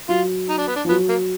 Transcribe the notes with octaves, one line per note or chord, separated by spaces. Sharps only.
F#3 F4
D#4
D4
B3
D4
F3
F#3 B3
A#3